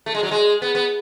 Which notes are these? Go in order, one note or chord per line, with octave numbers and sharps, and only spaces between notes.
A3
G#3
F#3
G#3
B3
B3